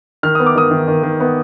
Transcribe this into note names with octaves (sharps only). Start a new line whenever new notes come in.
D#3 F6
B3 D#6
D6
D#3 D#6
D#3
D#3
D#3
B3